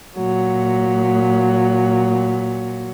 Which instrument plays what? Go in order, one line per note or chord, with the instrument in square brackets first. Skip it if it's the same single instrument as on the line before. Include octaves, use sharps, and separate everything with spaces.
[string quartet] A#2 F#3